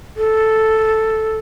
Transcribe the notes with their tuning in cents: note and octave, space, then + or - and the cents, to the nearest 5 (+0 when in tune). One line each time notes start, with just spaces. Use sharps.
A4 +0